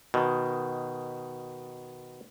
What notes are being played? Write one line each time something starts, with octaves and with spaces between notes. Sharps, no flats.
B2 D#3